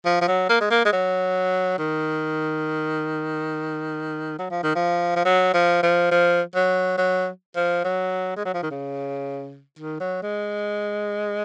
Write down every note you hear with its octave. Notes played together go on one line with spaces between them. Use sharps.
F3
F3
F#3
A#3
G#3
A#3
G#3
F#3
D#3
F#3
F3
D#3
F3
F3
F#3
F3
F3
F3
F#3
F#3
F3
F#3
G#3
F#3
F3
D#3
C#3
D#3
F#3
G#3